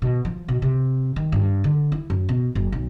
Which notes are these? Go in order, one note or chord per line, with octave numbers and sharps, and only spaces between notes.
B2
F3
B2
C3
D#3
G2
D3
E4
F#2
B2
F#1
B1